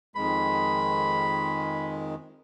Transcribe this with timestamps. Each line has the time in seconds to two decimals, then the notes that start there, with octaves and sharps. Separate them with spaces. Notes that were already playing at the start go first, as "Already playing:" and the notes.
0.16 F2 D#3 G#3 B5